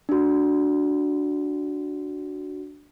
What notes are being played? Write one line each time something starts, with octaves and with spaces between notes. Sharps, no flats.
D4 F#4